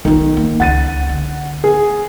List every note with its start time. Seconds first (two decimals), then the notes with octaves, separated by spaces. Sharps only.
0.05 B1 D#3 F4
0.37 A#3
0.60 C#2 F#5 A6 D#7
1.09 D3
1.64 G#4